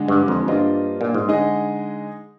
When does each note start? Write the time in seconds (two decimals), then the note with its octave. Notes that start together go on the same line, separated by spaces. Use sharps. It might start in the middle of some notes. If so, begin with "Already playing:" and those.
Already playing: D3 G#3 D4
0.08 G2
0.28 F2
0.48 G2 A#3 D4 F4 C5 D#5
1.01 A#2
1.14 G#2
1.28 D3 G#3 D#4 G#4 D#5